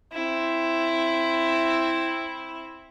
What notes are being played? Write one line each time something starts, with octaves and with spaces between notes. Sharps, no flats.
C4 E4